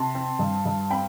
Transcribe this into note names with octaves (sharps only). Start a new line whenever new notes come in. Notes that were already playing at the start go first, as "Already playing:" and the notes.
Already playing: C3 A5 C6
C4
G2
G2
C4 G5 B5